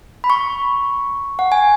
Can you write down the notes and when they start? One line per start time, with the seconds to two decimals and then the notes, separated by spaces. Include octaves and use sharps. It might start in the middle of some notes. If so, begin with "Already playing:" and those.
0.24 B5
0.30 C#6
1.39 F#5
1.52 G#5